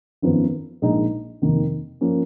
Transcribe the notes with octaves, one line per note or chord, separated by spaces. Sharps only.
G#1 F#2 F3 B3
A#1 A#2 G#3 D#4
F1 D#2 D#3 A#3
F3 A#3 C#4